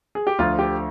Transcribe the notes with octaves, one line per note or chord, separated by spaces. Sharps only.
G#4
G4
D2 D3 F3 F4
G4